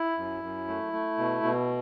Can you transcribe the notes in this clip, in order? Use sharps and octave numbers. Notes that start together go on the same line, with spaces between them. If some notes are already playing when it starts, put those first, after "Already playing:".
Already playing: E4
F#2
F#2
A3
A3
B2
B2